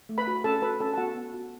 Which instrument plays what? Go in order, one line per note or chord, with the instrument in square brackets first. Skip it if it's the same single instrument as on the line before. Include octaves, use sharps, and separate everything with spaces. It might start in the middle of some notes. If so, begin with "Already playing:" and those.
[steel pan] A3
B4 B5
F#4
C#4 A4 A5
F#4 B4 B5
C#4 A4 A5
A5
B3 F#4 F#5
B3
F#4